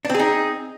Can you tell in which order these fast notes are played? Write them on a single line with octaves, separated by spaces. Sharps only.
D4 C4 G#4 D#4